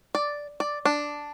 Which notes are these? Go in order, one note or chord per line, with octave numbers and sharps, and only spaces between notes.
D5
D5
D4